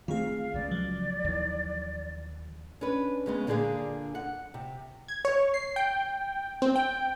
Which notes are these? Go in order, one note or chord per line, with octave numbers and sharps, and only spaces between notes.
D#3 A3 C4 F4 G#4 F5
C#2 C#3 G#3 D5
F3 F#3
D#2 D#3 E3
C#4 D4 B4
C#3 G#3 B3
A#2 D3 D4 G#4 F5
F#5
C3
G#6
C#5
C7
G5
C4
G5